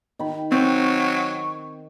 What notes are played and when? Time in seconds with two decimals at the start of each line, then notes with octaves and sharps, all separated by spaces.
0.19 D#3 B5
0.52 F#3 C4 C#6